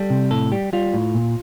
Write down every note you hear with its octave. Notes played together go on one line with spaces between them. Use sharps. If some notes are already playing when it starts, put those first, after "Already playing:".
Already playing: G3 A4
C3
A2 A4
G3 G4
G3 F4
A2
A#2